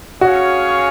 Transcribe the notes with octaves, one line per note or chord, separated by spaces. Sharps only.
C#4 F#4 G#4 C#5 F5